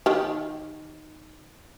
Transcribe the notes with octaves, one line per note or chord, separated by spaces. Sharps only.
D#3 G4